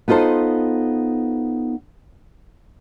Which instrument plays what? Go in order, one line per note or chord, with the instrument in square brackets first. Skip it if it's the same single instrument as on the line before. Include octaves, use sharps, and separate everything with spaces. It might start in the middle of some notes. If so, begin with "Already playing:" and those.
[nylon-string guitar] B3 D#4 F4 A4 C5